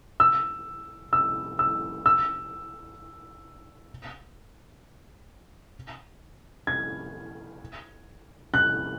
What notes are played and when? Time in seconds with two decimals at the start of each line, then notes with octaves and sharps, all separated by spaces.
0.20 E6
1.13 E6
1.59 E6
2.06 E6
6.67 G#6
8.54 F#6